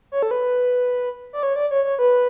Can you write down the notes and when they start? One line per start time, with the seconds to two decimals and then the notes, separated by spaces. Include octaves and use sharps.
0.12 C#5
0.23 A4
0.31 B4
1.33 D5
1.43 C#5
1.56 D5
1.71 C#5
1.85 C#5
1.99 B4